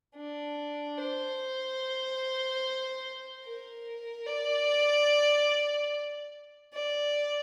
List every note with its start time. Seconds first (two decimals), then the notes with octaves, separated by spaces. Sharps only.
0.15 D4
0.98 C5
3.45 A#4
4.26 D5
6.74 D5